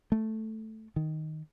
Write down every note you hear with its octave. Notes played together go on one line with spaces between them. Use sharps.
A3
D#3